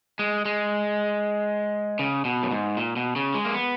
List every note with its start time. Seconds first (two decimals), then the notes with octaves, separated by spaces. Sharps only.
0.19 G#3
0.45 G#3
1.99 C#3
2.25 B2
2.43 F#2
2.51 G#2
2.77 A#2
2.96 B2
3.16 C#3
3.34 G#3
3.45 A#3
3.54 B3